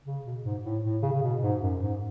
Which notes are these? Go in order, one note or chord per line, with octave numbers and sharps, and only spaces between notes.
C#3
B2
G#2
A2
A2
C#3
C#3
B2
G#2
F#2
G#2